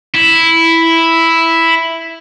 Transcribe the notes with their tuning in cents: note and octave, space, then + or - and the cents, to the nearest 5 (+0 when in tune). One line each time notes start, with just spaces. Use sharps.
E4 +0